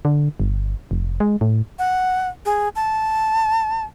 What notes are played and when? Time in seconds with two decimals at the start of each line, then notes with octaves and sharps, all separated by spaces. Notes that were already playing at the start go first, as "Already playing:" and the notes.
0.05 D3
0.40 G1
0.91 F1
1.20 G#3
1.41 A2
1.79 F#5
2.45 G#4
2.76 A5